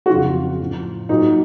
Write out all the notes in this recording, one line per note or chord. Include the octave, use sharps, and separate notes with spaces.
F#4
F2 C#3 F#3 F4
A2 F3
A#2 F#3 D#4